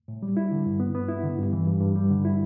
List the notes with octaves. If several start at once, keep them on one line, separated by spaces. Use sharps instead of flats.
A2
G3
E4
D3
G2
B3
B3
E4
D3
G2
E3
G2
G2
G3
D3
E4